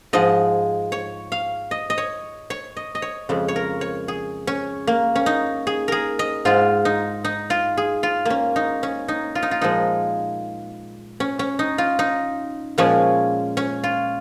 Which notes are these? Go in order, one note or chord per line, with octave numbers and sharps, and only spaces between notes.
G#2 F3 G#3 D#5
C#5
F5
D#5
D#5
C#5
C#5
D#5
D#5
C#5
F2 C#3 G#3
C#5
A#4
C#5
G#4
C#4
A#3
C#4
D#4
G#4
G#4 A#4
D#5
G#2 G#3 F4
D#4
D#4
F4
G#4
F4
A#3 C#4
D#4
C#4
D#4
F4
D#4
F4
A#2 F3 G#3 D#4
C#4
C#4
D#4
F4
D#4
A#2 F3 G#3 C#4
C#4
F4